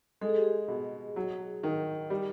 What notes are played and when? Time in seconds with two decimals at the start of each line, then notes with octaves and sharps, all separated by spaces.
0.21 G#3 A4
0.29 G#4
0.36 G4
0.44 G#4
0.68 B2
1.16 F#3
1.63 D#3
2.10 G3